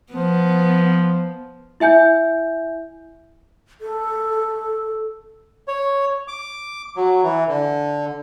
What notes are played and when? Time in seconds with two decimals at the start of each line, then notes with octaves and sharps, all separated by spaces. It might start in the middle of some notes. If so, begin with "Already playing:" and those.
0.13 F3 B3
1.80 E4 E5 G#5 G6
3.81 A4
5.68 C#5
6.28 D6
6.96 F#3
7.23 E3
7.48 D3